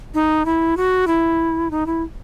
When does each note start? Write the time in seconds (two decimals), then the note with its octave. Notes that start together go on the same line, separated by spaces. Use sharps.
0.14 D#4
0.45 E4
0.77 F#4
1.07 E4
1.71 D#4
1.86 E4